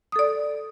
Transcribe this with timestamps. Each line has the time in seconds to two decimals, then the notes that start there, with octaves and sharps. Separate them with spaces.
0.12 D#6
0.16 A4
0.19 D5